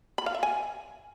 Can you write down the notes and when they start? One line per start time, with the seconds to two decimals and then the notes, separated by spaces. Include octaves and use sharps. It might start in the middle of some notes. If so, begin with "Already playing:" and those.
0.18 B5
0.26 F5
0.35 E5
0.43 G#5